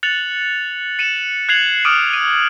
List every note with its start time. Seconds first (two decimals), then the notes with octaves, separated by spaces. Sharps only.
0.03 F#6 A6 C#7 F7 F#7
0.99 C#7 D#7 E7 F#7
1.49 F#6 G#6 C7 C#7 F7 F#7
1.85 D6 D#6 F6 C7 D7 D#7
2.13 D#7